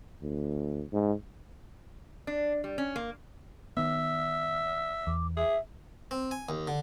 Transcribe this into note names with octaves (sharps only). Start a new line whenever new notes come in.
D2
G#2
D4
G3
C#4
A#3
D#3 B3 E5
E2 D6
G#4 E5
C4
G#5
D#2
D3